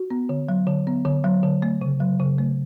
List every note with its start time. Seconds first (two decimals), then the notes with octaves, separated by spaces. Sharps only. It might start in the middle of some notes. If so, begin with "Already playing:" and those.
Already playing: F#4
0.10 B3
0.29 D3
0.49 F#3
0.67 D3
0.87 B3
1.05 D3
1.24 F#3
1.43 D3
1.62 A3
1.81 C#3
2.00 F#3
2.20 C#3
2.38 A3